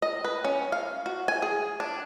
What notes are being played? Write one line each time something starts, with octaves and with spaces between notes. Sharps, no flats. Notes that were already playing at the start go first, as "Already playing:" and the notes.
D#5
B4
C#4
F5
F#4
G#5
G#4
D4